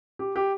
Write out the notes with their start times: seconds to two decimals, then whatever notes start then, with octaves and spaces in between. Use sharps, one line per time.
0.19 G4
0.36 G4